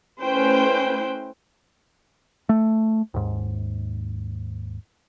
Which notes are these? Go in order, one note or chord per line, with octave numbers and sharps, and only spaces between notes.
A3 C#4 E4 B4 C5 G5
A3
D#2 G#2